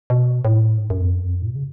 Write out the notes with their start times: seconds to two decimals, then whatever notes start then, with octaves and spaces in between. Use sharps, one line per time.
0.10 B2
0.45 A2
0.78 G#2
0.90 F#2
1.01 F2
1.13 F#2
1.24 F2
1.36 F#2
1.42 A2
1.48 B2
1.56 C#3